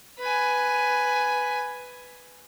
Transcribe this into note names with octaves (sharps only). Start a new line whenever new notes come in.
B4 G#5